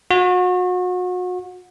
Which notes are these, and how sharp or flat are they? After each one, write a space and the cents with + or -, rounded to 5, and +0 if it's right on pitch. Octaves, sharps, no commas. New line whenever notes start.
F#4 -35